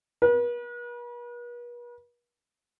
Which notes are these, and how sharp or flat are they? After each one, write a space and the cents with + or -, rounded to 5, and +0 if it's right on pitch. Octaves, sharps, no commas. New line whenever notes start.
B4 -45